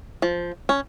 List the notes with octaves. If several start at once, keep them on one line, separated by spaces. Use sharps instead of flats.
F3
C#4